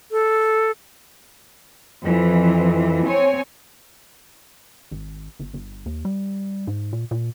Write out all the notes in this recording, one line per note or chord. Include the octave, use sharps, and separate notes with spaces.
A4
F2 E3
C4 C#5 G#5
G#1
G1
G1
D#2
G3
G#2
A#2
A#2